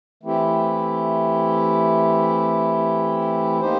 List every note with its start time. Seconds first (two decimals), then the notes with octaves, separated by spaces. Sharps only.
0.23 E3 A3 C4 E4 G4
3.61 A#3 D#4 G4 C5